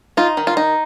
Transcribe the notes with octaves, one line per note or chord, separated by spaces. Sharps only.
D#4 F4
D#3
F4
D#4